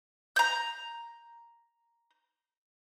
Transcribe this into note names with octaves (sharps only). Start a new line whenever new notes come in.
A#5 G6